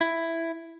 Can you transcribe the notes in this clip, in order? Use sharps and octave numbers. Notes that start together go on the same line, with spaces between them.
E4